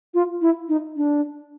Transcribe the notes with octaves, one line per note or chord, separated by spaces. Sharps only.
F4
E4
D#4
D4